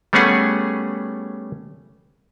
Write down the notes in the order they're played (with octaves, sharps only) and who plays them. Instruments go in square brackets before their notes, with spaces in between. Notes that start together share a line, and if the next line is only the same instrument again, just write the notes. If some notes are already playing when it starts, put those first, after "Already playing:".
[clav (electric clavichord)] G3 A3 B3 C#4 G#4 F#5